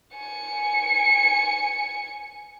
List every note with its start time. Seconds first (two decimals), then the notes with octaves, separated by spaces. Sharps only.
0.16 G#5 C#7